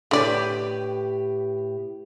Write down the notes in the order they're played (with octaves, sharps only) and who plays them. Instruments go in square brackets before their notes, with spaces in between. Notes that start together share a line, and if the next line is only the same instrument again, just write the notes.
[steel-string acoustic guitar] A2 G4 B4 [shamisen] D3 D5